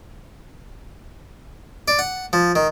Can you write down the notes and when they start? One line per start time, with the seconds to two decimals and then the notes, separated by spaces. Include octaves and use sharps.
1.88 D5
1.99 F#5
2.33 F3
2.56 D#3